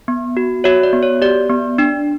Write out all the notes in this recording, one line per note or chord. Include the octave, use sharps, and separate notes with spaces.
B3
F#4
F#4 C#5 E5
D5
B3
C#5
G4 D5
B3
D4